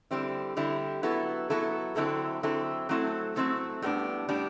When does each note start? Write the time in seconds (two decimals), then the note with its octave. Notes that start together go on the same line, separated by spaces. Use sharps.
0.11 D3 G3 C4 E4
0.57 D3 G3 C4 E4
1.03 F#3 B3 E4 A4
1.50 F#3 B3 E4 A4
1.96 D3 F#3 C4 E4 A4
2.43 D3 F#3 C4 E4 A4
2.89 F#3 A3 C4 E4 A4
3.36 F#3 A3 C4 E4 A4
3.82 A2 G3 B3 D4
4.28 A2 G3 B3 D4